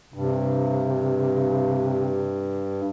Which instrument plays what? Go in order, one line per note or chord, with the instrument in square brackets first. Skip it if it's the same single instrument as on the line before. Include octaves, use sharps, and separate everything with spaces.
[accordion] G2 [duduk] C3